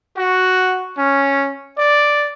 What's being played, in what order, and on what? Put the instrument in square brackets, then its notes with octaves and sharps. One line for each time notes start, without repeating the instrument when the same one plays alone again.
[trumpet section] F#4
C#4
D5